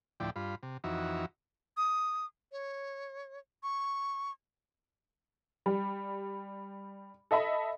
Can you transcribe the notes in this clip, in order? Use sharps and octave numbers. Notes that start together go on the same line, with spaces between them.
D2 A2 F3 E4 D5 G5
G2 F4 B5
C3
F2 E3 D#4 F#4 E5
D#6
C#5
C#6
G3
A4 D#5 E5 B5